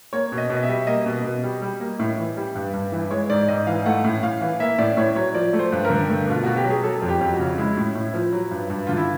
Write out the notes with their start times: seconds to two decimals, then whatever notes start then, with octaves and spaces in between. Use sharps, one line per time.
0.13 A#3 C#5
0.32 B2
0.38 D#5
0.50 B2
0.56 D#5
0.63 E5
0.69 G3
0.87 A#3 D#5
1.06 B2
1.24 B2
1.44 G3
1.62 G3
1.80 A#3
1.99 A2
2.18 E3
2.37 G3
2.55 G2
2.74 G2
2.92 E3
3.11 G#3 C#5
3.29 G#2 D5
3.48 G#2 D#5
3.67 E3 F5
3.86 A3 F#5
4.04 A2
4.23 A2 F5
4.41 E3
4.60 A#3 E5
4.78 A2 D5
4.97 A2 C#5
5.16 F#3 C#5
5.34 F3 D5
5.53 A3
5.59 C5
5.72 G2
5.85 A#4
5.90 D3
6.09 A3
6.27 B2 F4
6.44 B2 F#4
6.56 G4
6.64 F#3
6.70 G#4
6.83 F#3 A4
7.02 F2
7.08 G4
7.21 F2
7.34 F#4
7.39 C#3
7.58 G#3 E4
7.77 A2
7.95 A2
8.14 F3
8.32 F#3
8.51 G2
8.70 G2
8.87 D3 F4
8.97 E4